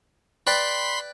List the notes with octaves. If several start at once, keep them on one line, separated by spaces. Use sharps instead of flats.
B4 D5 G5 B5 C6 B6